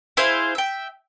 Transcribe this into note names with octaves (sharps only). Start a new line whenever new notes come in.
E4 G#4 C5 F5
E5 G5